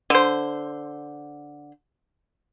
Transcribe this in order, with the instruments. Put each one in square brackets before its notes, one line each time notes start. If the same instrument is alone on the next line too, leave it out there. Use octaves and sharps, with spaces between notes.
[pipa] D3 C5